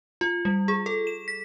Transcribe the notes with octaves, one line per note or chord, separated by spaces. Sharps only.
F4
G3
G#4
A4
E7
B6